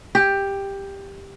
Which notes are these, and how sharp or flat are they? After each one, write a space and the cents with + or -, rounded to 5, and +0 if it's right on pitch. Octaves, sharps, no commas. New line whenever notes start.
G4 +10